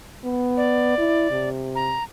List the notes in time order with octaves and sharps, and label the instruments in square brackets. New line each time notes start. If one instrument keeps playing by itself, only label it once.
[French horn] B3
[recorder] D5
[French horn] E4
C3
[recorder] A#5